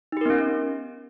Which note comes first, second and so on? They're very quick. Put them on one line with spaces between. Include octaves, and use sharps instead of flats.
D#4 G4 A#4 B3 C#4